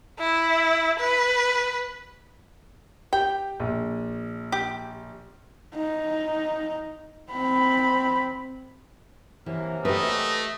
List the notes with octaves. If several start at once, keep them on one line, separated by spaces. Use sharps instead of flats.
E4
B4
G4 G5
A#1
G4
D#4
C4 B5
F#2 C3 E3 A#3
A3 G4 B4 D#5